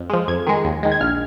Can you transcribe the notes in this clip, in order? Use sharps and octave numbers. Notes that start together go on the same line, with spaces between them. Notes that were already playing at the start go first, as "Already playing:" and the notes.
Already playing: F2
F3 G#3
F2 G#6
D#3 G#3
D#2
D#3 G#3
G#6
A#1 F6